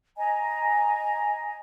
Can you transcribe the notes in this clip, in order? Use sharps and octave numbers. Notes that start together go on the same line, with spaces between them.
D#5 G#5 A#5